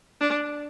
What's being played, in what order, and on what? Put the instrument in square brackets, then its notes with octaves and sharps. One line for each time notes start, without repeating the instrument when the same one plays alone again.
[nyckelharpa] D4